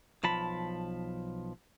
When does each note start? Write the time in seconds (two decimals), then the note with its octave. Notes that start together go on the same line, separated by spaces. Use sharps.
0.24 B1 F3 A5 B5